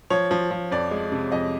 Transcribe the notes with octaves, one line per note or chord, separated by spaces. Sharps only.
F3 C#5
F3
F3
F2 D5
G#3
C3
F2 D#5